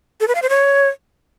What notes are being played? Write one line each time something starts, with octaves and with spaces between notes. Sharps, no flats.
A4
B4
F5
C5
C#5